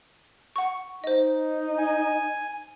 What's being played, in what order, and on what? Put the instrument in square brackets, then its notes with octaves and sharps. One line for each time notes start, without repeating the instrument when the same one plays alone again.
[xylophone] F#5 C#6
[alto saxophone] D#4 [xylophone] C5 D#5
[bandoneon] G#5